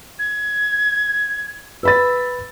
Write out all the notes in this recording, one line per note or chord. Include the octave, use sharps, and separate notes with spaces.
G#6
B4 B5 E6 A6